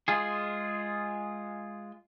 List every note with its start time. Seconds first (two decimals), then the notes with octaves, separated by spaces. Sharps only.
0.08 G#3 F4 G#4